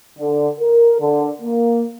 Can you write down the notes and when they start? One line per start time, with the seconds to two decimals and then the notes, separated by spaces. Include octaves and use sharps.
0.19 D3
0.60 A#4
1.00 D3
1.42 A#3